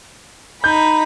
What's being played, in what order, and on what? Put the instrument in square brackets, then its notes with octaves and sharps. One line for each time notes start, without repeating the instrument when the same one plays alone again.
[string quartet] D#4 B5 [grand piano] G6